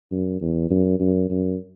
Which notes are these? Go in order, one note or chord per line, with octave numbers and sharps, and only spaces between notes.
F#2
E2
F#2
F#2
F#2